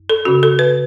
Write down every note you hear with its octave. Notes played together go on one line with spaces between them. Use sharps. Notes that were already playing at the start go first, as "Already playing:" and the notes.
Already playing: F#2
A4
C#3 A3 C#4 F#4
A4
B4